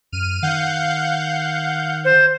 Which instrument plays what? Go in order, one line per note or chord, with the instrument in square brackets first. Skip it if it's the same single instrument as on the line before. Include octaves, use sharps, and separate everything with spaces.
[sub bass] F#2 [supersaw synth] F6 D#7
[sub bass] D#3 [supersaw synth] F5 F#5 G6
[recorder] C5